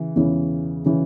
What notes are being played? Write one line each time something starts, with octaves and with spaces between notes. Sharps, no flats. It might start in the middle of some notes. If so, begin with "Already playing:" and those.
Already playing: C#3 E3
E2 C#3 E3
C#3 E3